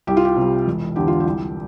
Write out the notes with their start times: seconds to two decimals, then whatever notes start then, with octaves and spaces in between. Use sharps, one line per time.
0.07 C2 G4
0.17 F4
0.25 G4
0.37 C3 G3
0.67 E1
0.96 E2 D3 G4
1.08 F4
1.20 G4
1.25 C2